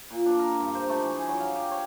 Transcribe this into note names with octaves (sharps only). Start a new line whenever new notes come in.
A#2
D4
A#4
G2
C5
A3
E3
G#4
F#3
F5
G4
C#5